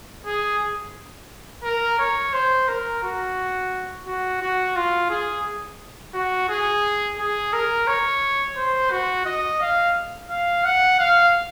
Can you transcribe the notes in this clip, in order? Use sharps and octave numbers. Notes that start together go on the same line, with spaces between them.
G#4
A#4
C#5
C5
A#4
F#4
F#4
F#4
F4
G#4
F#4
G#4
G#4
A#4
C#5
C5
F#4
D#5
F5
F5
F#5
F5